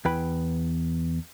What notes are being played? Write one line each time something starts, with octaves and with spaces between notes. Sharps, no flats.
E2 E4 B4 G5 B5